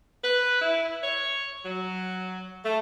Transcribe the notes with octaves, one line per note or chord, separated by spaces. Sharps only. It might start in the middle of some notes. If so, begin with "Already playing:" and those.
B4
E4
C#5
F#3
A3